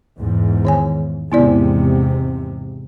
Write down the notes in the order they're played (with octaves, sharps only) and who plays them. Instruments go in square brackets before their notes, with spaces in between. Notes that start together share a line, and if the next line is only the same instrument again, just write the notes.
[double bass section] E2 G#2
[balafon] D#3 C#5 G#5
[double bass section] E2 G#2 C3 [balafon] B3 E4 D5